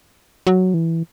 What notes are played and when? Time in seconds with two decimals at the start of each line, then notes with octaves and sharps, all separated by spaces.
0.47 F#3
0.74 E3